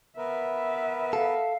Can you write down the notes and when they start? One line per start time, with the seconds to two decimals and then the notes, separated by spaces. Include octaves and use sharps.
0.17 B3 A#4 B4 E5
1.13 A4 F5